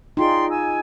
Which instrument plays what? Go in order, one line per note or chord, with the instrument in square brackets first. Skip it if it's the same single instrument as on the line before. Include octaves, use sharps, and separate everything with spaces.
[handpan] D#4 F4 G#4 [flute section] D5 G5 C6
[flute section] G#5 E6